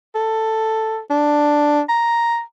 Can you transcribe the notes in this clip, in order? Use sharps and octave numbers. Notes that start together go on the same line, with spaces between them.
A4
D4
A#5